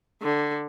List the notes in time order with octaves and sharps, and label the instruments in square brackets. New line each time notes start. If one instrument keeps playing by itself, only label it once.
[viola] D3